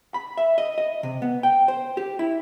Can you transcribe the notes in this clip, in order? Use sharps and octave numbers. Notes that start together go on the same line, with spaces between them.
B5
E5
D#5
D#5
C3
B3
G5
C5
G4
E4